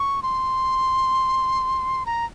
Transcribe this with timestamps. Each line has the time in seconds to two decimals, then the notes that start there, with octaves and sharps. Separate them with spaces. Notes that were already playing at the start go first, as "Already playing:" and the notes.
Already playing: C#6
0.23 C6
2.06 A#5